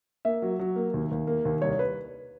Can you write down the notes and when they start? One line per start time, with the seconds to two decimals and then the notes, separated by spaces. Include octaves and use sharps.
0.25 A#3 E5
0.42 F#3
0.59 F#3
0.76 A#3
0.94 D#2
1.11 D#2
1.27 A#3
1.45 D#2
1.62 C2 C#5
1.79 B4